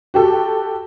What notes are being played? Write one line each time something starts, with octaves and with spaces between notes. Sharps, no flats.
F#4 G4 A4